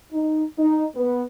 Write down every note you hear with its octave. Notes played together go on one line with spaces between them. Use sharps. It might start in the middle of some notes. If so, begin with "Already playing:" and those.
D#4
D#4
B3